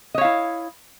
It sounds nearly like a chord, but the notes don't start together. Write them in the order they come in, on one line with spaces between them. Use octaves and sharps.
D#5 C#5 F5 E4